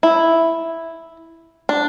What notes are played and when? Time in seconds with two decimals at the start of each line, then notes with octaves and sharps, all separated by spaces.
0.03 E4
1.69 D4